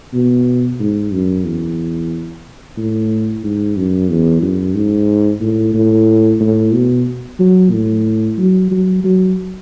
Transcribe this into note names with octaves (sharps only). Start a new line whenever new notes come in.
B2
G#2
F#2
E2
A2
G#2
F#2
E2
F#2
G#2
A2
A2
A2
B2
F#3
A2
F#3
F#3
F#3